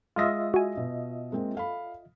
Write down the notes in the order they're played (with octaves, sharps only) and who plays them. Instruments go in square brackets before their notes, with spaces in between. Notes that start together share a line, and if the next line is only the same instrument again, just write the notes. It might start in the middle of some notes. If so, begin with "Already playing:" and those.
[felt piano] G#3 D#6 A#6 [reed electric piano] F4 D#5 E5
[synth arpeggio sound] F#4 G#5
[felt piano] B2
G#3 A#3 C4
A4 F5 B5